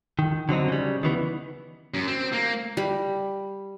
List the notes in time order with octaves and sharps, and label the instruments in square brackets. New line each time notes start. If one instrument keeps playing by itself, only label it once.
[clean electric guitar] D#3
D3 F#3 C4 D#4
C#3 G3
D#3 E3 B3
[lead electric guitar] F#2
C4
A#3
[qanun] G3 B5